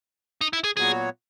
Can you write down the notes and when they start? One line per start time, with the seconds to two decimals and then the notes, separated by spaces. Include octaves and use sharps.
0.41 D#4
0.53 E4
0.64 G#4
0.77 A#2 F#3 B3 F#4 G#4 C#5